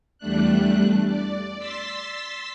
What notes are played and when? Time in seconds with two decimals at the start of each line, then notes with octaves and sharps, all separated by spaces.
0.18 E2 G3 A3 D4 F#6
1.07 D5
1.58 C6 E6 A6 B6